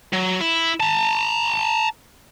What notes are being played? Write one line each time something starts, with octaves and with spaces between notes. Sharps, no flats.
F#3
E4
A5 A#5